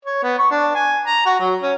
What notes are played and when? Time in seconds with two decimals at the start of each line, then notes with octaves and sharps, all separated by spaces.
0.05 C#5
0.23 B3
0.39 C#6
0.51 D4
0.75 G#5
1.06 A#5
1.25 F#4
1.40 F#3
1.62 C#4